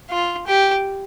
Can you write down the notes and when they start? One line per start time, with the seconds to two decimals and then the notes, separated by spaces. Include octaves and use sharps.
0.10 F4
0.47 G4